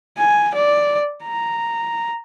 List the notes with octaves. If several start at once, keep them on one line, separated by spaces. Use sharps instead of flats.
G#5
D5
A#5